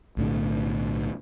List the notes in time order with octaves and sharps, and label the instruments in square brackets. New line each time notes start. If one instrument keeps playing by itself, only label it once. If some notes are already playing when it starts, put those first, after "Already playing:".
[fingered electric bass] B1 A2 D3